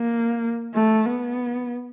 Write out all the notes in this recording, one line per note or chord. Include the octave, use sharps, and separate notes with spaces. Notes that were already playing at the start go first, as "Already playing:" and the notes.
Already playing: A#3
A3
B3